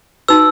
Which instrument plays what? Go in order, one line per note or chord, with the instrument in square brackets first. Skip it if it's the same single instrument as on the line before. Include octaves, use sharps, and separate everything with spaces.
[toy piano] D#4 F#4 B4 [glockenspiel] E6